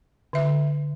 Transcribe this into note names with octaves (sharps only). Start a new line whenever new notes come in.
D3 E5